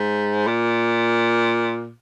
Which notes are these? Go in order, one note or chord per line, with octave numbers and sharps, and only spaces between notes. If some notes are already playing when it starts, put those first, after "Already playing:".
Already playing: G#2
A#2